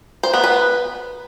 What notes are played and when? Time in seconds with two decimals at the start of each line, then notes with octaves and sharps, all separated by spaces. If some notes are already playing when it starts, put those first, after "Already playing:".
0.23 C5
0.34 B3
0.44 B4